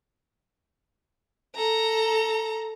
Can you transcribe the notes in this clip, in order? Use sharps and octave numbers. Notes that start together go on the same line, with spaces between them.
A4 A#5